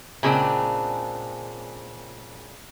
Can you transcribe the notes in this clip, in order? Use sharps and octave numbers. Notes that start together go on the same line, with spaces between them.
A#2 C#3 G#3 C4 D4